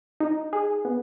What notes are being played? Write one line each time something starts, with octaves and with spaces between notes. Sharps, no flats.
D#4
G#4
B3